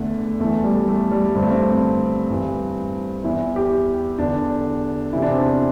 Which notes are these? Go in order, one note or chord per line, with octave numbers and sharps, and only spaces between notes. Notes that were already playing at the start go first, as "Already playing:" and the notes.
Already playing: E2 D3 A3
E2 E3 A3
G3
A3
G3
G2 D3 C4
A3
C4
G2 E3
E2 E3 E4
G4
E2 D3 D4
E2 C3 E3 E4
D4
C4
D4